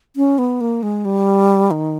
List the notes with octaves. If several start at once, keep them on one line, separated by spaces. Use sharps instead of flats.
C#4
B3
A#3
G#3
G3
D#3